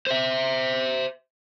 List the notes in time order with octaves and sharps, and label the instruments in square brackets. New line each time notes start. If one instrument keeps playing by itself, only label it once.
[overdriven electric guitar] C5 E5